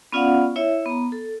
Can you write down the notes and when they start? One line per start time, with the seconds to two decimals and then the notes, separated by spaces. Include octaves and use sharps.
0.12 B3 C#4 F4 D5 F5 F#5
0.56 E4 C#5 E5
0.86 B3 A#5
1.12 A4